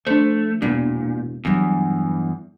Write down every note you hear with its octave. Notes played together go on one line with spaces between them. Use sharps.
F3 A3 D4 C5
E1 A#2 B3 D4 E4
E2 G2 F#3